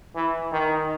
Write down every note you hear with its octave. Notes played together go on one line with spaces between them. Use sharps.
E3
D#3